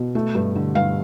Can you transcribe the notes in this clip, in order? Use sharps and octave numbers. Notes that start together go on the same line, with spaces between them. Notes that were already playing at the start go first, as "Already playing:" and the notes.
Already playing: B2
A3
G2
D3
G2 F5